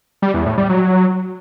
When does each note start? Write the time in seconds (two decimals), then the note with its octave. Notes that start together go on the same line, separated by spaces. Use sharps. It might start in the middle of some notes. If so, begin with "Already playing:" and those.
0.22 G3
0.34 E2
0.46 A2
0.58 G3
0.69 F#3